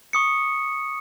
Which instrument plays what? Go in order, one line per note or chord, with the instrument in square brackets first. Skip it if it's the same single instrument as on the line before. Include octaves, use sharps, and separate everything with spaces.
[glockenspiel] C#6 D#6 C#7